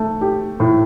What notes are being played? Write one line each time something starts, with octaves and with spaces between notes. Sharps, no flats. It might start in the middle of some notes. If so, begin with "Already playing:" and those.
Already playing: A3
G4
A2